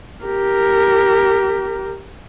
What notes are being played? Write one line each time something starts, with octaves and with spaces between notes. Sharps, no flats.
G4 A#4